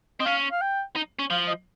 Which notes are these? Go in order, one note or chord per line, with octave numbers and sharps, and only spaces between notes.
C4 D#5
C#4 F5
F5
G5
D#4
C#4
F3 F5
D#5